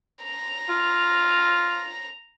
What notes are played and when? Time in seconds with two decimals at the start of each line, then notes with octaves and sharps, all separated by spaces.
0.24 A#5
0.69 F4